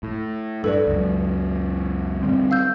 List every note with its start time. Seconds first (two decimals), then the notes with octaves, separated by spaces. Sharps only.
0.03 A2
0.64 G2 A4 B4 D5
0.87 C#2 F#2
2.23 D3 G3 C4
2.51 F5 E6 G6